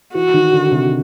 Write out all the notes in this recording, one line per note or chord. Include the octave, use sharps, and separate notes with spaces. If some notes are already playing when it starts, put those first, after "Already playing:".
E3 F#4
D#3
D3
C3